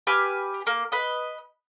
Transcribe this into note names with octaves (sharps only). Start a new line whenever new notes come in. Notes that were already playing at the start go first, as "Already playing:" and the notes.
G4 B4 G#5 F6
A#3
B4 D#5